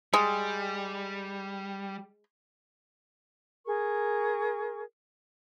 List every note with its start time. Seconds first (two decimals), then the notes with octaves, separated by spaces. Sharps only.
0.14 G3 G#3
3.65 G#4 A#4 C#6